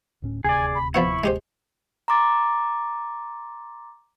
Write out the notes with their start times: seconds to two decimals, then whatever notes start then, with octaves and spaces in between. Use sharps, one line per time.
0.22 D1 A2 C#4
0.44 D#1 D2 C3 G#4 D5 G#5
0.75 B5
0.94 F3 B3 E4 F#5 B5 C#6
1.24 G#3 G4 C5
2.08 A#5 C6 D6 A6